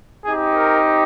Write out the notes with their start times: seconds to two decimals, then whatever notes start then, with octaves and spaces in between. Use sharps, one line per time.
0.24 C4 D#4 G4 G#4
0.53 A#4